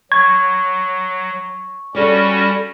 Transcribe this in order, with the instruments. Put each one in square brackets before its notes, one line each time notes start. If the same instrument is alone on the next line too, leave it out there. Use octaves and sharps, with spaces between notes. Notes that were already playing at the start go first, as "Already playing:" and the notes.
[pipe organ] F#3 [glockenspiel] C#6 [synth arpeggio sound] G#6
[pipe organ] G3 C#4 F#4 [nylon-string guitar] A4 C#5 D5